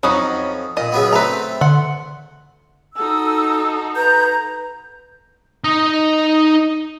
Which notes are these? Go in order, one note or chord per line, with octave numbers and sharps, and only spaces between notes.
F2 F#3 C#4 D#4 B5 D#6
A#2 D#5
C#3 F#3 B3
A3 C4 B4 A#5
D3 F#5 C6
D#4 F#4 A4 E6
B4 A#5 G6
D#4 D#5